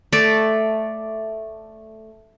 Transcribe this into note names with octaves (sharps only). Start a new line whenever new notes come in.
A3 D5